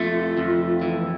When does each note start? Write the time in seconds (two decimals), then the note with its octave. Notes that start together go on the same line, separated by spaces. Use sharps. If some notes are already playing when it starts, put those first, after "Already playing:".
Already playing: F2 A3 F4
0.37 F2
0.82 E3